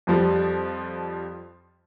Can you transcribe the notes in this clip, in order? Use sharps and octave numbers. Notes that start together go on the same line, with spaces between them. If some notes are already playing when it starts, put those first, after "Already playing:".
F2 F3 G3